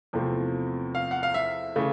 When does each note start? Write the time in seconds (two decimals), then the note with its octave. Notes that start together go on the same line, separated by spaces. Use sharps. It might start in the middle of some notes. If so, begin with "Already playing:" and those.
0.13 E2 C3 F3 A3 C4
0.95 F5
1.11 F#5
1.23 F5
1.34 E5
1.76 C#3 E3 A3